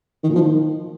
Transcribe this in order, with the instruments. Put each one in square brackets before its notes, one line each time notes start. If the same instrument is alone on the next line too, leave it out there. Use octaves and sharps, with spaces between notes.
[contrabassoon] D#3
A#2
F3
D#3